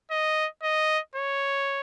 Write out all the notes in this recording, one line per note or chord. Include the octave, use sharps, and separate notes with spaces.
D#5
D#5
C#5